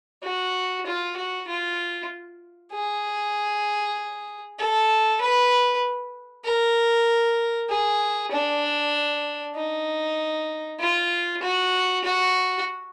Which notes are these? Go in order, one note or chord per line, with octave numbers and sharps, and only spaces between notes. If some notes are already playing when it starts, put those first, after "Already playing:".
F#4
F4
F#4
F4
G#4
A4
B4
A#4
G#4
D4
D#4
F4
F#4
F#4